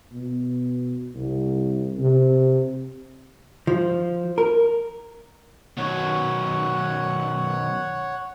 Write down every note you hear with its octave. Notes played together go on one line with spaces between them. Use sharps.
B2
C2
C3
F3
A#4
B2 D#3 F#3 C#5 F#5